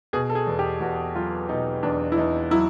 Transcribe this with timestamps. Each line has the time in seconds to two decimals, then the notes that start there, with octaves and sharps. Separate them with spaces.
0.13 B2 G#4
0.30 A4
0.35 G#4
0.47 E2
0.59 G4
0.81 E2 F#4
1.15 F#3 F4
1.49 B2 D#4
1.83 E2 D4
2.12 E4
2.17 E2 D#4
2.51 F#3 E4